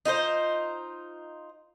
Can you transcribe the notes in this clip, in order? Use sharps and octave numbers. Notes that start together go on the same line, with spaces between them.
D#4 F4 A#4 C5